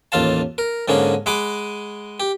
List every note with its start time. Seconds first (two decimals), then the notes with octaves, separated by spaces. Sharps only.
0.12 A1 D#2 F4 F5 A5
0.58 A#4
0.88 G#2 D3 A#3 C#4 G#4
1.26 G#3 G#4 F#5 B5 D6
2.20 G4